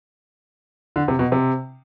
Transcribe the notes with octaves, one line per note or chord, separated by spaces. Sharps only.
D3
C3
B2
C3